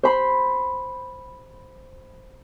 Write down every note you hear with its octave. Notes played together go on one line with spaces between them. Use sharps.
C5 B5 C6